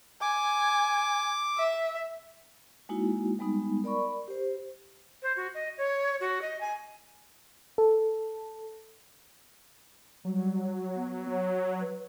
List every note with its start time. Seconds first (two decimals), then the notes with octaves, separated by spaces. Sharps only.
0.22 G#5 D6
1.57 E5
2.89 G#3 A#3 D#4 E4 F#4
3.39 G3 G#3 B3 D#4
3.84 A#4 D5 B5 C#6
4.28 G4 C5
5.22 C5
5.36 F#4
5.54 D#5
5.77 C#5
6.20 F#4
6.41 D#5
6.60 G#5
7.78 A4
10.25 F#3 G3
10.96 B3
11.30 C#5
11.81 B4